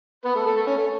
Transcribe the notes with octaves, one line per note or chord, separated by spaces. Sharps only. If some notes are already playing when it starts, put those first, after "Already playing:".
B3 B4
A3 A4
A3 A4
A3 A4
C#4
A3